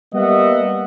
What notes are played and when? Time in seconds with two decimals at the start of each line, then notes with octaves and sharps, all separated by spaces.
0.14 G3 A#3 B3 D#5 E5 F#5